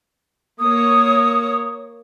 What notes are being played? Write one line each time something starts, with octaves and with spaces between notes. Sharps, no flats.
A#3 C#5 D#6